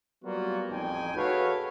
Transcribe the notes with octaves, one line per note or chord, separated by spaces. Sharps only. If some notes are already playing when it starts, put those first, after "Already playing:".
F#3 G3 A#3 B3 F4 F#4
A1 F2 F3 D#4 G5 G#5
F#4 G#4 A4 B4 C#5 F5